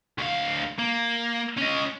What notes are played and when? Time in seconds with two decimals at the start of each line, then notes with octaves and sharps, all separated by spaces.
0.18 D2 F5
0.79 A#3
1.58 C#4 D#5